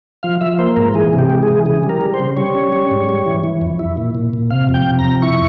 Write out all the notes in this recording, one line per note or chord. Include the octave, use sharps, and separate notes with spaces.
F3 F5
F3 E5
A#3 C5
G#2 A#4
E3 G#4
C3
G4
G#3
G#4
E3
C#3 G#4
G3
A#4
G3
C5
C#3
G3 C#5
C#4
G3
G#2
G3
E3
E3
F2
E4
A#2
A#2
A#2
C3 F5
F2
G5
C3
A#5
F2
E4 C#6